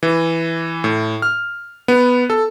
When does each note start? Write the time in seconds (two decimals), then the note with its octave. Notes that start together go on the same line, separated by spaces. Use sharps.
0.03 E3
0.84 A2
1.22 F6
1.88 B3
2.30 A4